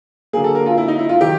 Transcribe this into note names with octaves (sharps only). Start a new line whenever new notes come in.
D3 F#3 A#3 G#4
A4
A#4
F4
E4
D#4
E4
F4
D#3 F#3 G4